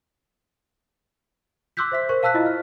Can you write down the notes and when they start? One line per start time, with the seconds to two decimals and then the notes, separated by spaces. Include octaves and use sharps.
1.77 C6 D6 E6 F#6 G6 B6
1.92 C5 E5 B6
2.09 A#4 C5 C#6
2.23 F5 A5 E6 F#6 B6
2.34 E4 F4 D#5
2.46 F6